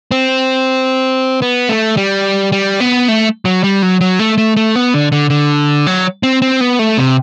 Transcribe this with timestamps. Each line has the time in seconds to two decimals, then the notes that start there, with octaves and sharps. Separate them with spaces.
0.11 C4
1.42 B3
1.69 A3
1.97 G3
2.52 G3
2.80 B3
3.08 A3
3.45 F#3
3.64 G3
3.82 F#3
4.01 F#3
4.19 A3
4.38 A3
4.57 A3
4.76 B3
4.94 D3
5.12 D3
5.30 D3
5.87 F#3
6.23 C4
6.42 C4
6.61 B3
6.79 A3
6.98 C3